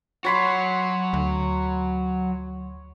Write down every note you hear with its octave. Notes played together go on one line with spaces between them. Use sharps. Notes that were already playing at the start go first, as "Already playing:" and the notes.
F#3 F#4 C#5 B5 C6
D2